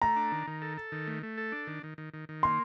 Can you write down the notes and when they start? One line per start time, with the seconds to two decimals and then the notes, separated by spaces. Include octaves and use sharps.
0.02 A3 A#5
0.16 D4
0.32 D#3
0.47 D#3
0.62 A4
0.78 A4
0.92 D#3
1.07 A3
1.23 A3
1.38 A4
1.52 D4
1.67 D#3
1.83 D#3
1.98 D#3
2.14 D#3
2.29 D#3
2.43 A#3 C6